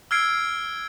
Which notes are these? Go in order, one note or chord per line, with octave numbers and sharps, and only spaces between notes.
E6 F6 G#6 C7 D7